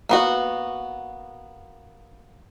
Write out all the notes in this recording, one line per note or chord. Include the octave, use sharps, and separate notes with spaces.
A#3 B3 F#4